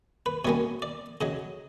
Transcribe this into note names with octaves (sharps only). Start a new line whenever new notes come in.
B4
B2 G3 A#3 C#4 C#5
D5
C#3 F#3 D#5